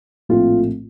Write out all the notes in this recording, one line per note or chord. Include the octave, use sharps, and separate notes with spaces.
A#1 A2 A3 C4 F4